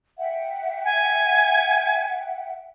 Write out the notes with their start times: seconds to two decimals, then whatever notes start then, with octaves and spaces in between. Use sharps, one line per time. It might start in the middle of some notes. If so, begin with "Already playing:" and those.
0.18 E5 F#5 G5
0.85 G#5